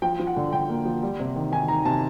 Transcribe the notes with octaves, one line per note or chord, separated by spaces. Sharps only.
F3 G5
F3
F#5
D3
D3 G5
A#3
F3
G3
C3
D#3
D#3 G#5
D#3 A#5
C3 A5